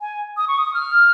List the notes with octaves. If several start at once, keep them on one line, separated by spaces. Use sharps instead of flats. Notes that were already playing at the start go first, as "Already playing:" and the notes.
G#5
D#6
C#6
D#6
F6